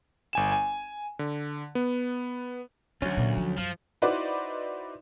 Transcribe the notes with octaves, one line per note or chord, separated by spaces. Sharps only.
G1 G#5 E7
G#5
D3
B3
D2 D#3 F#3 C#4
A#2
F3
F#2 F3
D#4 E4 F#4 B4 C5 D5